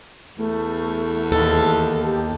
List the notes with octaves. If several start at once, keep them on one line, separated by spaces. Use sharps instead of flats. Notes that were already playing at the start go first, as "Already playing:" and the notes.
E2 A3
D#2 A4
G4